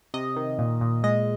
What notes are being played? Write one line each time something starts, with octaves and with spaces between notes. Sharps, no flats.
C3 D#5
D#3
A#2
A#2
G#3 D#5